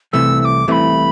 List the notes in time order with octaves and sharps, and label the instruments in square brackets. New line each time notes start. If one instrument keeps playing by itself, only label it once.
[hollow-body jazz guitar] C2 C3 E3 A3 [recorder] E6
[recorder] E6
D6
[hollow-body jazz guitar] C2 C3 E3 A3 [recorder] B5 D6